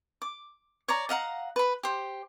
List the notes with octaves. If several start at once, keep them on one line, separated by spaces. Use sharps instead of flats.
D6
C#5 D5 A#5
D#5 F5 F#5 A#5
B4 B5
G4 C5